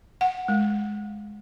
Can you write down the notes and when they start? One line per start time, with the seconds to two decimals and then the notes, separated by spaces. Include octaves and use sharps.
0.21 F#5
0.48 G#3